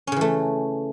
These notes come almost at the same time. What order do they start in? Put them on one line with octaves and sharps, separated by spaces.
C#4 C#3 E3 A3